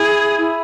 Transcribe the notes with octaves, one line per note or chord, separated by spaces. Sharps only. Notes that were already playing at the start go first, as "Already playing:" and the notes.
Already playing: E4 G#4
E4